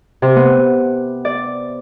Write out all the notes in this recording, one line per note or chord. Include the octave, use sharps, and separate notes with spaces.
C3
B3
D5